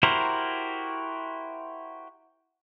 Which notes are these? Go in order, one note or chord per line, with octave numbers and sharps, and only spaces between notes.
E4 F#4 G4 A#4 C5